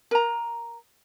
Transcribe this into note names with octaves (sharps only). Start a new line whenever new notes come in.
A#4 A#5